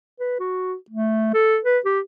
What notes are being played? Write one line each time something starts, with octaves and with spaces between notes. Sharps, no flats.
B4
F#4
A3
A4
B4
G4